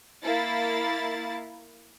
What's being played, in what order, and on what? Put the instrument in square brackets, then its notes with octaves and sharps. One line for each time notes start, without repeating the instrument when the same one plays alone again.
[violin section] A#3 E4 A6